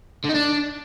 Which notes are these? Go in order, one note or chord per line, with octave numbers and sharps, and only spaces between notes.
D3
D#4
D4